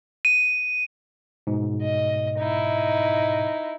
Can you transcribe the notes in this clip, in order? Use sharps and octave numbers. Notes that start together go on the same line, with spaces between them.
D#7
G#2 B2
D#5
D#4 E4